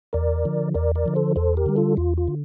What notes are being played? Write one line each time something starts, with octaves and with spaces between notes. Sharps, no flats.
E2 A#4 D5
D3 F3
E2 A#4 D5
A#4 D5
D3 F3
A4 C5
E2 A4 C5
G4 A#4
D3 G3
F4 A4
E2 F4
F4
D3